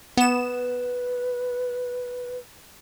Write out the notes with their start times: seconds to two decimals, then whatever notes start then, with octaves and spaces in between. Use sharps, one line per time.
0.17 B3 B4 E7